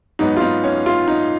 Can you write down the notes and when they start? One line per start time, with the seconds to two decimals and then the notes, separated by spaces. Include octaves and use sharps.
0.19 G#2 F#3 B3 D#4
0.37 F4
0.41 D#4
0.64 C#4
0.86 F4
1.08 D#4